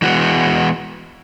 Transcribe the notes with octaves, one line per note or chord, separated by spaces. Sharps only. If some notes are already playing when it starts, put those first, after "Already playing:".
E3 G#3 B3 F#4